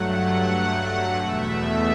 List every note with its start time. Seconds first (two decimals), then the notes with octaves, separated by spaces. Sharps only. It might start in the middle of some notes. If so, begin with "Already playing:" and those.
Already playing: G2 F#3 A3 F#5
0.40 F#5
1.16 E2 B2 A3 E5
1.55 E5